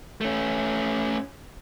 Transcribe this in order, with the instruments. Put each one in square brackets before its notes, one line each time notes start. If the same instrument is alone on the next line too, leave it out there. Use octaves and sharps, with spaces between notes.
[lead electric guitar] A3 C#4